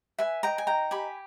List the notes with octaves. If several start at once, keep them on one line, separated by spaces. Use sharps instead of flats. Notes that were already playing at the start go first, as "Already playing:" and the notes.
B4 E5 G#5
D#5 G5 A#5
G#5
D#4 G5 A#5
G4 G#5 B5